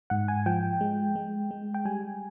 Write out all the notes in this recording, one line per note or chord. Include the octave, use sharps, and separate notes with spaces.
G#2 F#5
G#5
F3 G5
G#3
G#3
G#3
G5
G3 G#5